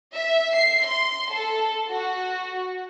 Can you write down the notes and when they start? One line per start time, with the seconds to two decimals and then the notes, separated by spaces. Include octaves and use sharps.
0.15 E5
0.55 C7
0.85 C6
1.33 A4
1.91 F#4